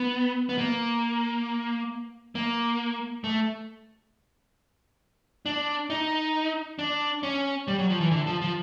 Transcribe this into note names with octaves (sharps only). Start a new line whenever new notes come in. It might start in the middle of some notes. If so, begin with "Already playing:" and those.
Already playing: B3
B3
A#3
A#3
A3
D4
D#4
D4
C#4
G3
F#3
F3
E3
D3
F3
F3